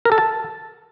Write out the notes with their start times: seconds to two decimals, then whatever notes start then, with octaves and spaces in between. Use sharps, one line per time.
0.05 A#4
0.12 A4
0.18 A5